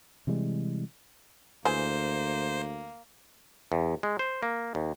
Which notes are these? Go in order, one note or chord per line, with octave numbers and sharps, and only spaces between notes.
C3 E3 G3 G#3
D2 E3 A#3 G#4 C5
E2
G#3
C5
A#3
D#2